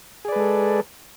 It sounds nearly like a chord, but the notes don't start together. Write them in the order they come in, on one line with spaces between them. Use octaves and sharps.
G#4 D5 B4 G#3 A4